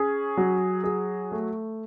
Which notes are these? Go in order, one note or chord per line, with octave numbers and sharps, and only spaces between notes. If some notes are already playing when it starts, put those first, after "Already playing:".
Already playing: C#4 G#4
F#3
G#4
A3